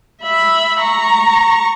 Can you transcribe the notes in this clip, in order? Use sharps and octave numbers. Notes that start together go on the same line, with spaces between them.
E5 B5
A#5 C#6